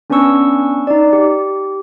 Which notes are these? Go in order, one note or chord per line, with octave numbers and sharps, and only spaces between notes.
B3 C#4 D4 B4 C#6 E6
D#4 D5
G4